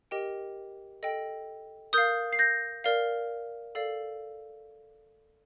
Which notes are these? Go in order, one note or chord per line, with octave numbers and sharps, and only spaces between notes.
G4 A#4 D#5 G5
A4 D#5 G5
A#4 F5 D#6 G6
C7
G6 A#6
A#4 D5 F5
A4 D5 F5